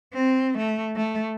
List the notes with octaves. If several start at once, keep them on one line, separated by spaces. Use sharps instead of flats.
C4
A3
A3